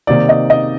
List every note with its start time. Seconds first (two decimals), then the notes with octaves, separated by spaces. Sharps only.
0.07 C3 D#3 A#3 D#4 D5
0.29 D#5
0.50 D#5